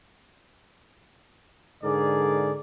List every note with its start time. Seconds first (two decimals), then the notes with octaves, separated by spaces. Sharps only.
1.83 G#2 D3 G#4 A#4 D5